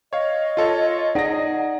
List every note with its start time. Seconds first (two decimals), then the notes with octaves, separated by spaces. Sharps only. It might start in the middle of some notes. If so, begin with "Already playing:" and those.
0.13 C#5 D#5 F5
0.57 F4 A4 C#5
1.15 D#4 G#4 D5 D#5 F#5 A#6